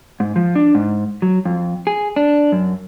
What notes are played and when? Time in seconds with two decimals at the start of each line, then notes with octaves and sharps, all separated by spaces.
0.20 G#2
0.36 F3
0.55 D4
0.75 G#2
1.22 F#3
1.45 F2
1.87 G#4
2.16 D4
2.52 F#2